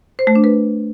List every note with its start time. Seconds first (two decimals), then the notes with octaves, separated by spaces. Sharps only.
0.19 C5
0.27 A3
0.35 D4
0.44 B4